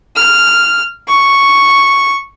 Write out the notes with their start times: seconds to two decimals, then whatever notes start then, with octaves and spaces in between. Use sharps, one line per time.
0.16 F6
1.08 C#6